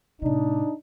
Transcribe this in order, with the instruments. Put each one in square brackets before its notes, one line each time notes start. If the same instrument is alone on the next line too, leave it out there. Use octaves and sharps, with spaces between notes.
[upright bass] A2 C3 [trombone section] D4 D#4